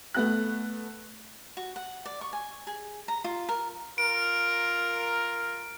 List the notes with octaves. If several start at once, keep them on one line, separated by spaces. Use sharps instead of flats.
A3 B3 F#6
F#4
F#5
D5
C#6
G#5
G#4
A#5
F4
A#4
F4 A#4 D7